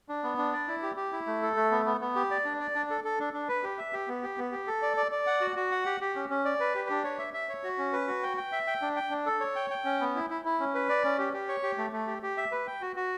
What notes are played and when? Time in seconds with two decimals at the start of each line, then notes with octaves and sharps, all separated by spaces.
0.09 D4
0.23 B3
0.38 D4
0.53 D5
0.68 E4
0.82 G4
0.97 G4
1.12 E4
1.26 A3
1.42 A4
1.56 A3
1.71 B3
1.86 B3
2.01 B3
2.15 G4
2.31 D5
2.45 D4
2.60 D5
2.75 D4
2.90 A4
3.04 A4
3.19 D4
3.33 D4
3.48 B4
3.63 G4
3.78 E5
3.93 G4
4.08 B3
4.23 G4
4.38 B3
4.52 G4
4.67 A4
4.82 D5
4.97 D5
5.12 D5
5.27 F#5
5.41 F#4
5.56 F#4
5.71 F#5
5.86 G4
6.01 G4
6.16 C#4
6.30 C#4
6.45 D5
6.60 B4
6.75 G4
6.90 D4
7.04 C#5
7.19 E5
7.34 E5
7.49 C#5
7.63 F#4
7.78 C#4
7.93 B4
8.07 F#4
8.23 G5
8.37 G5
8.52 E5
8.67 G5
8.82 D4
8.96 G5
9.11 D4
9.26 A4
9.40 C#5
9.56 G5
9.70 G5
9.85 C#4
10.01 B3
10.16 E4
10.30 E4
10.45 E4
10.60 C#4
10.74 B4
10.89 D5
11.04 C#4
11.18 G4
11.33 G4
11.48 C#5
11.63 G4
11.78 A3
11.92 A3
12.07 G4
12.23 G4
12.37 E5
12.52 B4
12.67 G5
12.81 F#4
12.96 F#4